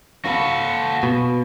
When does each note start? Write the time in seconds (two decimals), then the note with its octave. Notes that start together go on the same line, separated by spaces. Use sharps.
0.25 F#4 A4 F5 B5
1.03 B2